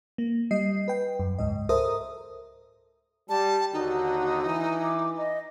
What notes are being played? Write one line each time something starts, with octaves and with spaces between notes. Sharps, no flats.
A#3
G3 D#5 C7
B4 G5
F#2
C#2 G#2 D#5
A4 A#4 C5 E5 A#5 D#6
G3 A5
D#2 D3 D#4 F#4
E3
D6
D#5